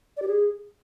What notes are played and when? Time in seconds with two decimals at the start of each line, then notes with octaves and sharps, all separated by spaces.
0.17 D5
0.22 G4
0.27 G#4